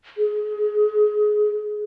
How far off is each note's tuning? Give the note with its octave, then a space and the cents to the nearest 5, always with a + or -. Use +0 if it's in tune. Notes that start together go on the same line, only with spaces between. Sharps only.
G#4 +20